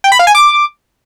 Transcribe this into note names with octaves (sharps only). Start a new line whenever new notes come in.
G5
B5
F5
G#5
D6